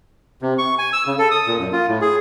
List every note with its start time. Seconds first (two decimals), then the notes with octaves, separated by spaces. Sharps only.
0.42 C3
0.58 C#6
0.78 G#5
0.93 E6
1.07 C#3
1.19 A4
1.31 D#6
1.47 A#2
1.59 F#2
1.73 F4
1.88 A2
2.01 G#4